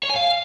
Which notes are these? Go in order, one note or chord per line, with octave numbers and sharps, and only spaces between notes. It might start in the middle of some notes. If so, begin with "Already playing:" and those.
C#5
G#5
F5